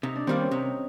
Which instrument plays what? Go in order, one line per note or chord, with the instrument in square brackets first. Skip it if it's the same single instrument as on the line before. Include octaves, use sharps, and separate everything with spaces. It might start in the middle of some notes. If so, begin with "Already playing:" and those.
[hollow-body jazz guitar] C3 [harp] D#4
[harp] D4
[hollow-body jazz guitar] D#3 G3 A#3 [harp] C4
[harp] C#4
[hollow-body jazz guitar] C3 [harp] D#4